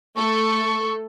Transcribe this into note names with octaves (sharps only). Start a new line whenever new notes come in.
A3 A4 C#6